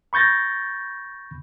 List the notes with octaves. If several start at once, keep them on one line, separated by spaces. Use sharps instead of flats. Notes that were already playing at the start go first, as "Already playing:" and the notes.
B5 C#6 G6 A6 A#6